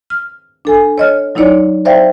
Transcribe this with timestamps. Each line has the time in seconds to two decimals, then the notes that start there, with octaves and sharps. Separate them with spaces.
0.10 F6
0.65 D4 A4 G#5
0.98 C#5 D#5 F6
1.35 F#3 D#4 E4 C#5 D5
1.85 C5 D5 E5 F5 G5